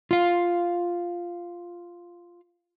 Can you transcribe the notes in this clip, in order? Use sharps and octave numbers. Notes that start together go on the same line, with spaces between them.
F4 F5